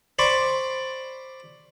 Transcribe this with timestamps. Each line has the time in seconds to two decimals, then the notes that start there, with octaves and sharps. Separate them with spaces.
0.19 C5 D5 B5 C#6